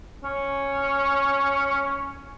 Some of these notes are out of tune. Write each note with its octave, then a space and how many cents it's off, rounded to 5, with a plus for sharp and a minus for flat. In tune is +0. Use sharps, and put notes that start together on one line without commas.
C#4 +0